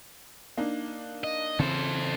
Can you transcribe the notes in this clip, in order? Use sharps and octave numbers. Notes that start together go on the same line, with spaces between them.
A#3 D4 D#4
D#5
C#3 E3 C4 A4 C5